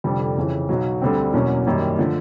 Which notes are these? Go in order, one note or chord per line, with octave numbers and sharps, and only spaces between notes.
F1 F2 D3 G3
F2 C#3 E3
B1 B2 F#3
D2 D3 G3 C4
E2 B2 F#3 A#3 C#4
F#2 D#3 G3 A#3
D3 F3 A3